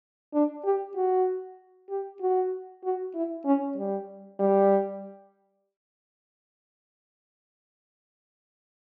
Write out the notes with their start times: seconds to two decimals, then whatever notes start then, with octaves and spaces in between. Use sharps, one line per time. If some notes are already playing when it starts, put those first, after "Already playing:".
0.34 D4
0.65 G4
0.96 F#4
1.89 G4
2.21 F#4
2.84 F#4
3.15 E4
3.46 C#4
3.77 G3
4.40 G3